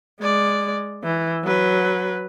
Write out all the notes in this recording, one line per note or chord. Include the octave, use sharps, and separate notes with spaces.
G#3 D5
E3
F#3 B4